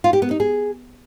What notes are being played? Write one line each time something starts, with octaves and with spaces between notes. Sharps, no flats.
F4
G4
B3
D#4
G#4